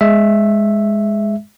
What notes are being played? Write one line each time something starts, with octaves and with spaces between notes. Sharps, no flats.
G#3 E5